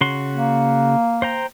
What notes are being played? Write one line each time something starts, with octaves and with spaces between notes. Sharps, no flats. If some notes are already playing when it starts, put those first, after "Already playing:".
C#3 F#4 C6
A#3
C5 G5 A#5